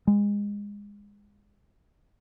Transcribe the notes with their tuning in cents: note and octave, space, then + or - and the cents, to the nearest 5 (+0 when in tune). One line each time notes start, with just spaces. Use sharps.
G#3 -25